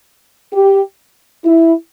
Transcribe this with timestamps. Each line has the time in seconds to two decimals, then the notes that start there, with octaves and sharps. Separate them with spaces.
0.54 G4
1.45 E4